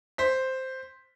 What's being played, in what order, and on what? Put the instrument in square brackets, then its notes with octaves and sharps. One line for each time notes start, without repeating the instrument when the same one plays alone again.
[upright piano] C5 B6